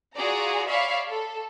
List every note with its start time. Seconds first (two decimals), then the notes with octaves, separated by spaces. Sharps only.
0.15 F4 F#4 G#4 D5 A#5
0.68 C#5 D5 E5 F5 B5 C#6
1.09 A4